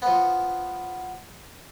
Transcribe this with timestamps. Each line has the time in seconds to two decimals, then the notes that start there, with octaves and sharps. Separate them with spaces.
0.02 F3 B3